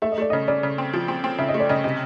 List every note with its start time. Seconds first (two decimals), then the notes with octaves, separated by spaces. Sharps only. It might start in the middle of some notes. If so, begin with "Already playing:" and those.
0.02 A3 E5
0.12 D#5
0.18 A3 D5
0.30 C#3 D#5
0.48 C#3 D5
0.63 C#3
0.78 C4
0.93 F3
1.08 C4
1.24 C4
1.38 C#3 E5
1.49 D#5
1.54 A3
1.60 D5
1.69 C#3 D#5
1.84 C3 D#5